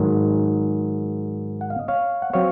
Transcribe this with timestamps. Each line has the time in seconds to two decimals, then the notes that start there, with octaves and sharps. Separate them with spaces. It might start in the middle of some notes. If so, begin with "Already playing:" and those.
Already playing: G#2 D#3 F#3
1.61 F#5
1.70 F5
1.79 D#5
1.88 C#5 F5
2.22 F#5
2.33 F#3 C4 C#5 F5